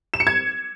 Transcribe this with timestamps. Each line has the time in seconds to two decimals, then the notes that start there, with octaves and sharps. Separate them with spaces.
0.14 E7
0.20 C#7
0.27 G#6